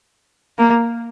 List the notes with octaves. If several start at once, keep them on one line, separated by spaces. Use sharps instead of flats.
A#3